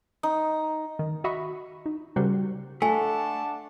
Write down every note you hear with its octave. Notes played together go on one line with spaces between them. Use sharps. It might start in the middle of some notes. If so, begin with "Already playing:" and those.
D#4
D#3
F#4 D#5 E5 B5 C#6
D#4
C#3 G3 F#4 A#4 C5
A3 D4 F#5 G#5 A5